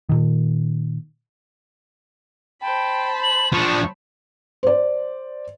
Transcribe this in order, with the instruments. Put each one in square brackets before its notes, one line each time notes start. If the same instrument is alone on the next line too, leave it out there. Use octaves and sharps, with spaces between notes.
[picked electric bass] A#2 D#3
[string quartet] C5 A5 B5 [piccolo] G5
[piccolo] F#7
[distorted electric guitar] F3 D4 [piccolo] C#6
[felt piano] C5 D5